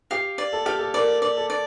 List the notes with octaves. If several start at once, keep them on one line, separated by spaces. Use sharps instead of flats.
G4 F5
D5
A4
G4 F5
A4
A#4 D5
D5
A4
D5